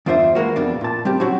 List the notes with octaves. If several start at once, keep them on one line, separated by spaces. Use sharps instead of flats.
E2 G2 D4 F4 C5 E5
E3 G#3 A#3 F#4
F2 B2 D4
A#2 A5
G3 C4 G4
F#3 C#4 E4 F#4 C5